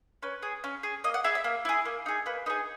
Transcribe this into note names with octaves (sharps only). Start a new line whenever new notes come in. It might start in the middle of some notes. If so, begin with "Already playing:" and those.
C#4 B4
G#4
C#4
G#4
A#3 D#5
F#5
E4 G#4 E5
E5
A#3
E4 G#4
A#3
D#4 G#4
A#3 B4
D#4 G#4 B4